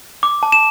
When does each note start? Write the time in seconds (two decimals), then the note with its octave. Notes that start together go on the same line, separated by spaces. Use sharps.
0.23 D6
0.43 A5
0.52 E7